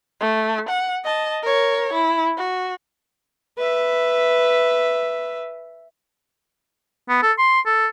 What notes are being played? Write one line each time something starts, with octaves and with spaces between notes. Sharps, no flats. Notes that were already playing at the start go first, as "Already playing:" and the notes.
A3
F#5
D#5 A5
A#4 C#5
E4
F#4
B4 E5
B3
A4
C6
A4